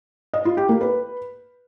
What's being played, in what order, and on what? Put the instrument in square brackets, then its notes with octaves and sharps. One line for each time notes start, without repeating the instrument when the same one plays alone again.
[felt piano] D#5
F4
G4
A#3
B4